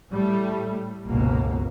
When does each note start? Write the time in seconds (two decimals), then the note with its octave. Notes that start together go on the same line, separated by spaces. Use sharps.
0.10 A2 G3 A3
1.06 G1 C#2 B2 A#3